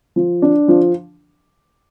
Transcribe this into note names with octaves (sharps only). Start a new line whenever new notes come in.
F3
D4
F3